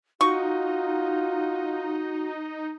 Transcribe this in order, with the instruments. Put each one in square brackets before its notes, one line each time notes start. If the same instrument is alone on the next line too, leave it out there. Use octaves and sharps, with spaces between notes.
[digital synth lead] D#4 [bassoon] F4 [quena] F#4 [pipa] C#6